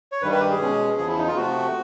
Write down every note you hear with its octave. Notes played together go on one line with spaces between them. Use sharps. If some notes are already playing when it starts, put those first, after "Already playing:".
C#5
G2 D#3 G3 B4
B4
G4
G#4
B2 G#3 C#4
E2 C#3 F3 G#4
E4
D#4
F4
C3 F3 A3 F#4